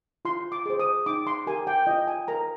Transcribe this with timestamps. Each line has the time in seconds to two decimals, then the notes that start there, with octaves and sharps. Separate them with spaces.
0.25 F4 C6
0.52 D6
0.66 G#4 C5
0.80 D#6
1.06 D#4 D6
1.27 C6
1.47 G4 A#4 G#5
1.67 G5
1.87 F4 D#5
2.08 G#5
2.28 A#4 A#5